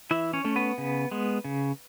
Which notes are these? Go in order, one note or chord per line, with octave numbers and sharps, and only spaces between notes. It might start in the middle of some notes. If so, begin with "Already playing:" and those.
E3 E4 E5
C#4 C#5
A3 C#4
B3 B4
C#3
G#3 B3
C#3